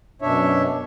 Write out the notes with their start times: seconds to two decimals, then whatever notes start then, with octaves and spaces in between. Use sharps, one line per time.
0.22 F#2 B2 D4 C#5 E5